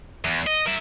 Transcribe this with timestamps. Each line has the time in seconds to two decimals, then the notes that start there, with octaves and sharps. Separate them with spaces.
0.25 E2
0.47 D#5
0.66 A#4 E5